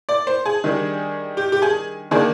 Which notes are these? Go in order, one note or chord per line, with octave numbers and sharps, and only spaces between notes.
D5
C5
G#4
D#3 G3 D4
G4
G4
G#4
D#3 A#3 D4 G#4